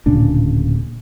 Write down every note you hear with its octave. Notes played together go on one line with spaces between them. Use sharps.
D1 A#2 C#3 D4